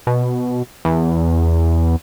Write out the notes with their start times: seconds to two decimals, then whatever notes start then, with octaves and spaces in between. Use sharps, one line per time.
0.07 B2
0.85 E2